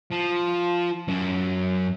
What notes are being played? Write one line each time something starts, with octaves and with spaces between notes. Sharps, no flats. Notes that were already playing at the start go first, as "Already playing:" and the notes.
F3
F#2